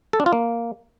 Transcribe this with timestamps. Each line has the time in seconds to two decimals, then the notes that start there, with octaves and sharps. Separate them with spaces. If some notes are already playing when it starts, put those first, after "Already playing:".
0.13 A4
0.20 D4
0.26 F4
0.33 A#3